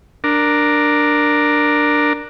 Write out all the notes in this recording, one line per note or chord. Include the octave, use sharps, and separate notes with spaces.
D4 A#4